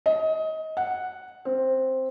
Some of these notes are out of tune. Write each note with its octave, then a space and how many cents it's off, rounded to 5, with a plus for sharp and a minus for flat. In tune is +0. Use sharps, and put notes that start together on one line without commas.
D#5 +25
F#5 -5
C4 +5